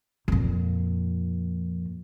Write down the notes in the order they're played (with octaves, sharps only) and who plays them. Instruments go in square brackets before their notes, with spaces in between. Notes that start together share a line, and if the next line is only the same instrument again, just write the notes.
[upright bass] F2 A#2